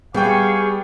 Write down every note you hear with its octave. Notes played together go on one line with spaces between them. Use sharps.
G3 B3 G#4 F5 G5 G#5 C#6